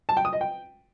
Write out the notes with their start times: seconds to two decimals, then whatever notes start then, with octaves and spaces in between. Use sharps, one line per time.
0.09 A5
0.17 G5
0.25 D#6
0.33 D#5
0.41 G5